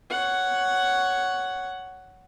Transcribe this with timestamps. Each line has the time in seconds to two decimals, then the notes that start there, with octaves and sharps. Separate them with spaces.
0.11 C#5 F#5